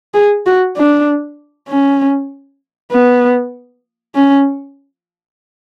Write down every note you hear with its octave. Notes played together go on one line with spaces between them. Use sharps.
G#4
F#4
D4
C#4
B3
C#4